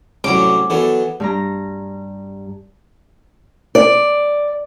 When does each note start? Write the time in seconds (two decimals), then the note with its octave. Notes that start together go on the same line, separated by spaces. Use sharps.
0.24 C2 A2 F#3 C#4 D6
0.70 E3 F#3 B3 A4 D5
1.20 G2 G3 A#5
3.75 D5